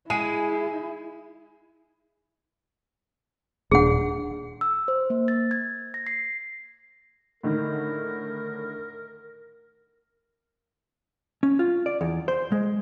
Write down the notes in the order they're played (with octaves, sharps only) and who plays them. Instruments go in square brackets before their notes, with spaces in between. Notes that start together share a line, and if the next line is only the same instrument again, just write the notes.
[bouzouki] G#3 [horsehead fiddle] E4 [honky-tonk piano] G#5 D#7
[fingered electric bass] D#1 C4 D4 [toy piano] G#4 F#5
[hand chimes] E6
C5
A#3
A6
G#6
A#6
C7
[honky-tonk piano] A2 D3 D#3 [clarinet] A#4
[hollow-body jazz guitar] C#4
F4
D5
E2
C5
G#3